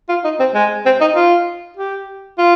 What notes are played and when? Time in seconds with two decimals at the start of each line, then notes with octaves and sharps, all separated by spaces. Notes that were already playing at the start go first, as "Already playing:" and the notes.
0.09 F4
0.24 D#4
0.39 C4
0.55 G#3
0.86 C4
1.01 D#4
1.15 F4
1.77 G4
2.38 F4